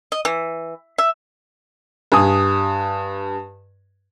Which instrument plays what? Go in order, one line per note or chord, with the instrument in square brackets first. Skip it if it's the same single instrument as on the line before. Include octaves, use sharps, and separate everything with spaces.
[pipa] D#5
E3
E5
[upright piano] G2 G#5 D#6